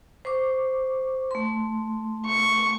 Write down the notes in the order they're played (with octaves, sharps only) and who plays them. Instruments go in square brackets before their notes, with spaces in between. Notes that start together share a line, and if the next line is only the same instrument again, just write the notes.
[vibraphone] C5 C#6 D6
A3 C6
[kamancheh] C#6